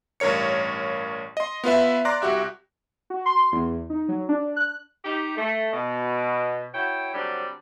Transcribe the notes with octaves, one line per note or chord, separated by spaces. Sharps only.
A1 G2 A#4 C#5 C#7
D#5 C6
B3 F4 B4 E5
D5 A#5 C6 D6 F#6 A#6
C2 F#4 G4 E5
F#4
C6
E2
D#4
F#3
D4
F#6
D#4 G4
A3
B2
E4 F#4 C#5 G5
D3 F#3 G3 C4 G4